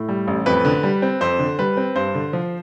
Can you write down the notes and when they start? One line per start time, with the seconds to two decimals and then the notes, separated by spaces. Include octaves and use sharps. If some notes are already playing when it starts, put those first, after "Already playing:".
Already playing: A2
0.09 G3
0.28 A1
0.46 F2 B4
0.65 D3
0.83 G3
1.02 C4
1.21 F2 C5
1.39 D3
1.59 G3 B4
1.77 C4
1.95 G2 C5
2.15 D3
2.33 F3